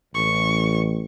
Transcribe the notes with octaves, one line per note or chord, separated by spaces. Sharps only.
A1 C#6